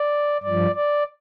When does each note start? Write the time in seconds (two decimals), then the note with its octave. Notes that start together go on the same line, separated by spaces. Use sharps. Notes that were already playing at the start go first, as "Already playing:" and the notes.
Already playing: D5
0.43 G2 D5
0.49 F3
0.75 D5